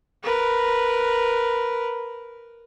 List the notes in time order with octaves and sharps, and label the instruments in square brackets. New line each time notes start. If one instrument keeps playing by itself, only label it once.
[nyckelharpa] A#4 B4